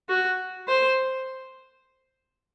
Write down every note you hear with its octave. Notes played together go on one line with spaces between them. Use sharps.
F#4
C5